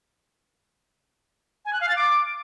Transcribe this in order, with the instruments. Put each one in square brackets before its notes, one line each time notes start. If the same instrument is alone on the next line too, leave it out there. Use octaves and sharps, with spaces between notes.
[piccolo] G#5
F#6
F5
A6
D6